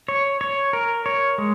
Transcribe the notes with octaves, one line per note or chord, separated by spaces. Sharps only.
C#5
C#5
A#4
C#5
G#3